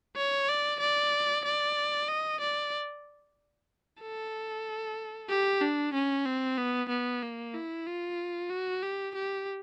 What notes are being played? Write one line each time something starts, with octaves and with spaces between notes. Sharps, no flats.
C#5
D5
D5
D5
D#5
D5
A4
G4
D4
C#4
C4
B3
B3
A#3
E4
F4
F#4
G4
G4